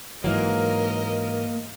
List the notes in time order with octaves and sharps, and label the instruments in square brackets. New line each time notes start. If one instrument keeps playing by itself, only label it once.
[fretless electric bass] G#2 E3 F#3 [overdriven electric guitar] A#3 [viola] A#4 D#5